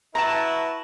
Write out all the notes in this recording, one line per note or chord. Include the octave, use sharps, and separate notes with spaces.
E4 F#4 B4 A5 A#5